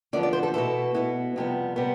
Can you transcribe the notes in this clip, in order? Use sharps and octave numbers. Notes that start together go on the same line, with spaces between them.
E2 D3 F3 B3 D5
D5
C5
A4
B2 B3 E4 A4
B2 B3 E4
F2 C3 G3 B3
C3 G3 B3